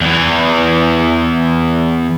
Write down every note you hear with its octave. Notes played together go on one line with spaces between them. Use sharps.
E2 E3